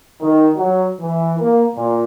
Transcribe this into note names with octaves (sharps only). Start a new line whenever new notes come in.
D#3
F#3
E3
A#3
A#2